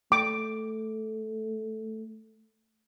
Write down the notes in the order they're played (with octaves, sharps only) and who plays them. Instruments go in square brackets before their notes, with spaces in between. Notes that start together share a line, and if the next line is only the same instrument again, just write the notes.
[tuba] A3 [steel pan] D6